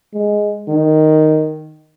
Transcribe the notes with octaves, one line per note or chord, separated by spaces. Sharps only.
G#3
D#3